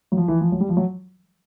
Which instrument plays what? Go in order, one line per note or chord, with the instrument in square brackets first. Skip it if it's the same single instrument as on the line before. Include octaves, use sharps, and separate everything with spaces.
[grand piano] F#3
F3
E3
F3
F#3
G3
F3
F#3